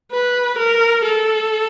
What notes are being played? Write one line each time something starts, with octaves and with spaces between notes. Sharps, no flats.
B4
A#4
A4